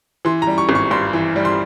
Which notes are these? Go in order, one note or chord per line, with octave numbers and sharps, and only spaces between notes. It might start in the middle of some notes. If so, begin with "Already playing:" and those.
E3 C6
A#5
G3
C#6
G#1
C#6
G2 C6
E3
G3
C6